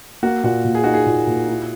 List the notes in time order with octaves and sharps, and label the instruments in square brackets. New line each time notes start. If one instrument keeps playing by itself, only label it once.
[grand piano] A#3 [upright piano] F#4
[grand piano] A#2 [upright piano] F#4
[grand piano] A#2
[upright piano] G#4
[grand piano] D#4 [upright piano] F#4
[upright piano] G#4
[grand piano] A#2
A#2
E4